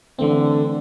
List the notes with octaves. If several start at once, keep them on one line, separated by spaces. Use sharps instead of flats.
D3 E3 A3 C4